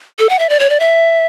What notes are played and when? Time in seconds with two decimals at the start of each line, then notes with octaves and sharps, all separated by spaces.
0.19 A4
0.29 F#5
0.39 E5
0.49 D5
0.60 C#5
0.70 D5
0.80 E5